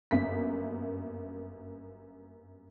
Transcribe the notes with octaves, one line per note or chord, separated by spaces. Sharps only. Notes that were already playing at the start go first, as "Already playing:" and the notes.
G1 F#2 A#3 B6